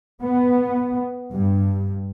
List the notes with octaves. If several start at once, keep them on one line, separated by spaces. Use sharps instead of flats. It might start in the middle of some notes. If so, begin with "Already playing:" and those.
B3
G2